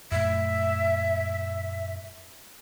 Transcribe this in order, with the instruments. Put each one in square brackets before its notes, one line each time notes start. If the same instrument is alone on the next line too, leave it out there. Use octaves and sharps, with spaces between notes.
[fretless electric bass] F#2 A#2 A3 [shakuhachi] E5